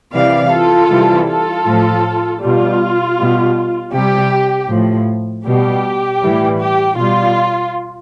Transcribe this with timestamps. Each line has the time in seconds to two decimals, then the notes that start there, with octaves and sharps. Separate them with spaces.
0.13 C3 E3 G3 D5 F5
0.51 F4 A4
0.90 C3 E3 G3
1.28 F4 A4
1.66 A2 F3
2.41 B2 G3 F4
3.17 B2 G3
3.93 C3 G3 G4
4.69 A2 F3
5.45 B2 G3 G4
6.22 A2 E3 G3
6.59 G4
6.97 B2 G3 F4